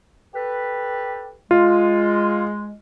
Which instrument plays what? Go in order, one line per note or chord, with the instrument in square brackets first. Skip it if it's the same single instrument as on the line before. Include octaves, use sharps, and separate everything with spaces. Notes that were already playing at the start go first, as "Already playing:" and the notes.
[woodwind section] G4 A4 B4
[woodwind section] G#3 [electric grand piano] F4